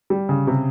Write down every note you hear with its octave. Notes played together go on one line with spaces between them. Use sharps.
G3
C#3
C3